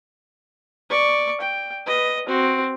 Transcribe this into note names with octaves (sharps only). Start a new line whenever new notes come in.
D5 C#6
G5
B4 D#5
C4 F#4